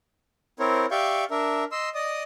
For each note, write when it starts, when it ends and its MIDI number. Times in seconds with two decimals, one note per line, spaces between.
0.59 0.86 60
0.59 0.86 64
0.59 0.86 70
0.59 0.86 72
0.59 0.86 73
0.91 1.24 67
0.91 1.24 74
0.91 1.24 76
0.91 1.24 77
0.91 1.24 85
0.91 1.24 91
1.31 1.64 62
1.31 1.64 70
1.31 1.64 76
1.72 1.89 75
1.72 1.89 84
1.72 1.89 88
1.95 2.23 74
1.95 2.23 75
1.95 2.23 87